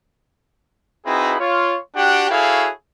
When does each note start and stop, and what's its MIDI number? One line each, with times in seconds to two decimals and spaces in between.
1.06 1.36 60
1.06 1.36 63
1.06 1.36 64
1.06 1.36 66
1.06 1.36 68
1.06 1.36 71
1.40 1.77 65
1.40 1.77 73
1.96 2.28 62
1.96 2.28 66
1.96 2.28 67
1.96 2.28 78
1.96 2.28 79
2.30 2.70 64
2.30 2.70 66
2.30 2.70 68
2.30 2.70 69
2.30 2.70 73
2.30 2.70 77